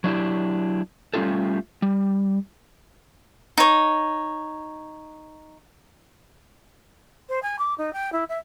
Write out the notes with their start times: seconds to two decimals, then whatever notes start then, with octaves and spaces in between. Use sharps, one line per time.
0.04 F#3 D4 E4 G4
1.14 G3 A3 C#4 F4 G4 A4
1.82 G3
3.58 D#4 C#5
7.29 C5
7.42 G#5
7.58 D6
7.78 D#4
7.93 G5
8.12 E4
8.28 E5